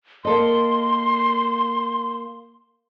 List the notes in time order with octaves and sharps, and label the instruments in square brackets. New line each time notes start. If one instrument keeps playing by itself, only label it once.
[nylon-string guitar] A#3 A4 D#5 [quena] C6